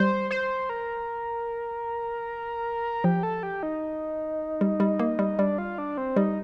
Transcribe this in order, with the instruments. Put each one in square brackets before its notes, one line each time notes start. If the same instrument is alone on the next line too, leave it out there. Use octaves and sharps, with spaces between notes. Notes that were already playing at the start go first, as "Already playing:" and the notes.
Already playing: [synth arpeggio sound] G3 [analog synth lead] C5
[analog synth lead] C5
A#4
[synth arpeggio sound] F3 [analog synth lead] G4
[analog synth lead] A4
G4
D#4
[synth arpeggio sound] G3
G3
A#3
G3
[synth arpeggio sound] G3 [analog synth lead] D4
[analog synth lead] F4
D4
C4
[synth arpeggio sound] G3 [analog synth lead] D#4